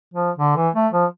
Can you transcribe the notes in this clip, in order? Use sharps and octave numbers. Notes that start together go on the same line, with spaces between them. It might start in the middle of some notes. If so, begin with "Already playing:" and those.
F3
D3
E3
A3
F3